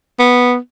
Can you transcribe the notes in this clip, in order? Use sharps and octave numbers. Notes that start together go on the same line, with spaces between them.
B3